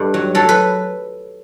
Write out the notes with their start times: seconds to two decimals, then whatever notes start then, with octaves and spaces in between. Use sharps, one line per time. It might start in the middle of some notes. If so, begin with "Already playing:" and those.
Already playing: G2 A4
0.14 F#3
0.35 F#3 A4
0.49 B4